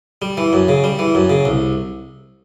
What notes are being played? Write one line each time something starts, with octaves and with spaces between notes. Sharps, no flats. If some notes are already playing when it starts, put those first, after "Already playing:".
G3
E3
F#2
C#3
G3
E3
F#2
C#3
C2